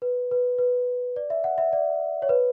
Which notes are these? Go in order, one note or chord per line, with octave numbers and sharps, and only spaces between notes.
B4
B4
B4
D5
E5
F#5
E5
D5
C#5
B4